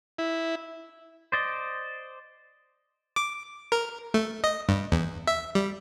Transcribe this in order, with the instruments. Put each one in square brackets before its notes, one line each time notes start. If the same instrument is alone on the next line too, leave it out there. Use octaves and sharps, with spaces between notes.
[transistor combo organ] E4
[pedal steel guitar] C5 D5 D#5
[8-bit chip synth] D6
A#4
A3
D#5
G2
E2
E5
G3